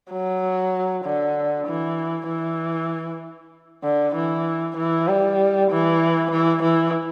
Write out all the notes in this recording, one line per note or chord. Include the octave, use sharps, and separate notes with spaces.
F#3
D3
E3
E3
D3
E3
E3
G3
E3
E3
E3